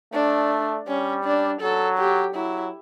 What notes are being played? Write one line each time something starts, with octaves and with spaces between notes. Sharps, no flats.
A3 D4
G3 C#4
D4
F#3 A4
G4
F#3 E4